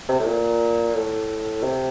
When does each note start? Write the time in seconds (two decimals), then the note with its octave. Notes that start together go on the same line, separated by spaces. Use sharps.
0.09 C3
0.19 A2
0.26 A#2
0.95 A2
1.62 C3